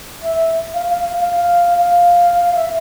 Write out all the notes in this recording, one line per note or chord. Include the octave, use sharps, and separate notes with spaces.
E5
F5
F5
F5
F5
F5
F5
E5